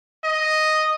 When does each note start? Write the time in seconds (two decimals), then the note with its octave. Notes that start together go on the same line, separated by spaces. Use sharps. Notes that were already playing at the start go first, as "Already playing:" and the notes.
0.24 D#5